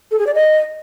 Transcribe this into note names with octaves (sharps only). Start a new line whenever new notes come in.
A4
G#4
D5
D#5